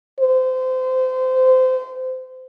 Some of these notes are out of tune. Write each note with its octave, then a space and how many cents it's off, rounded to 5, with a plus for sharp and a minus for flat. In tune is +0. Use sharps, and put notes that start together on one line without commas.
C5 -25